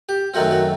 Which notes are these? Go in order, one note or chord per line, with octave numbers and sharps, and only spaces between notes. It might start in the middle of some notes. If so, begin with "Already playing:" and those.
G4
F#2 D#3 F#3 A3 C4 F#4
F#4